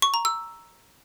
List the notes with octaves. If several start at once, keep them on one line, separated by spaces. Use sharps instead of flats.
C#6
A#5
E6